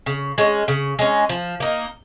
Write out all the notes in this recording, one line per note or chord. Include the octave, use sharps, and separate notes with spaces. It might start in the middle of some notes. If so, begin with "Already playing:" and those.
C#3
G#3 C#4
C#3
G#3 C#4
F3
A#3 D#4